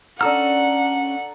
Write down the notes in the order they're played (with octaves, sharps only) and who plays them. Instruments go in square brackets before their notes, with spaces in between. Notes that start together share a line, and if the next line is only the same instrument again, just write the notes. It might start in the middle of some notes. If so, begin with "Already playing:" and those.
[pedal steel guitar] C#4 E6 F6 [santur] D4 A4 A#5 [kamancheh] F#5